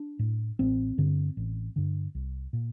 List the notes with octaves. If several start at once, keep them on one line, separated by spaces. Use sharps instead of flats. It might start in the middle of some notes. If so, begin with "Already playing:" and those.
Already playing: D4
A2
A1 C4
G2 D3
A1
G2 D3
C2
A#2